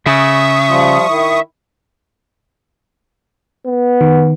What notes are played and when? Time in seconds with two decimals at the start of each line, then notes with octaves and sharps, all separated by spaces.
0.06 C#3 E5 C#6 D#6
0.69 F3 G3 F4
1.09 D#3 E4
3.66 B3
4.01 D#3